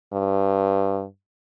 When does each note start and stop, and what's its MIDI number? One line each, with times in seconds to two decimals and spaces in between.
0.13 1.04 43